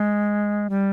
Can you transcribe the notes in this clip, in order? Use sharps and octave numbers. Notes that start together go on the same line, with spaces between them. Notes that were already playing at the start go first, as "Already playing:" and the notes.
Already playing: G#3
G3